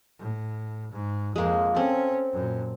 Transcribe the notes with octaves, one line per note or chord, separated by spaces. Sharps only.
A2
G#2
F2 G#3 A#3
C4 C#4 A4
F#2 A#2